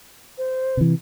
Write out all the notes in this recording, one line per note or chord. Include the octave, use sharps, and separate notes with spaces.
C5
C3 E3